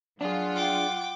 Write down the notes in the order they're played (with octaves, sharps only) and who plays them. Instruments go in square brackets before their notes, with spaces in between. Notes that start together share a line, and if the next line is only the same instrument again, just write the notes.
[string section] F#3 F4 [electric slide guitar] D4 G#4 [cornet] F#5
[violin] G5 D6